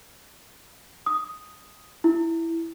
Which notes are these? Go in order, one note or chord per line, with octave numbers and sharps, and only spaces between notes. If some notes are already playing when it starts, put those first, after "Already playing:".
D#6
E4